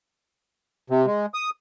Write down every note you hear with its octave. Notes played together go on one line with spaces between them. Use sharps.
C3
G#3
D#6